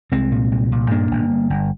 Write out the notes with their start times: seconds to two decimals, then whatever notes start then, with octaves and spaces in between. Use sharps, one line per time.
0.12 C2 G#3 C4
0.32 A#2
0.52 C2
0.71 A#2
0.90 G2 A#3 D4
1.11 G1
1.31 G2
1.50 G1